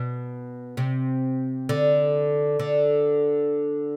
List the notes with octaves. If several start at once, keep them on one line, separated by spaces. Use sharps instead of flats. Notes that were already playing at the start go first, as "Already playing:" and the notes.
Already playing: B2
C3
D3
D3